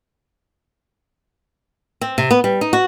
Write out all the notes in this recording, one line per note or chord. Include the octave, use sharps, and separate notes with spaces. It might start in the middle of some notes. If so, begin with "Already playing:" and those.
C4
C3
B3
G3
D#4
F#4